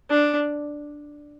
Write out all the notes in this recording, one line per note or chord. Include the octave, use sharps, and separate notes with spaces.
D4